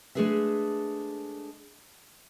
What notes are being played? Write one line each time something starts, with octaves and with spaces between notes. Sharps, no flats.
G#3 A3 D4 G#4 B4 E5